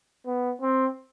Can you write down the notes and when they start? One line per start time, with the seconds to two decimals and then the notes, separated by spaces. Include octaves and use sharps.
0.26 B3
0.62 C4